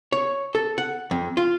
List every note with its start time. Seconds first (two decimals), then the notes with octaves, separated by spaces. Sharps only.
0.12 C#5
0.55 A4
0.78 F#5
1.11 F2
1.37 F4